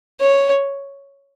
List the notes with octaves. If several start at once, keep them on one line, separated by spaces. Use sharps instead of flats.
C#5